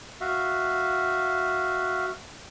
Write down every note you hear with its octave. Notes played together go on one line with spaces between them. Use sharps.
F#4 E5 F5